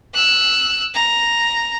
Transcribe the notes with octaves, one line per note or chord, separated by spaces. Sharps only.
E6 F#6
A#5